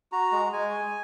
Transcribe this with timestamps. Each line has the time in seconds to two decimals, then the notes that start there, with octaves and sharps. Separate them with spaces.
0.12 F#4 A#5
0.32 G#3
0.52 G#3 G#5